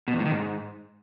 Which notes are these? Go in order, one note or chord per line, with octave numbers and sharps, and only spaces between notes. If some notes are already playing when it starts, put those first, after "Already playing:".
B2
E2
A2
D#3
G#2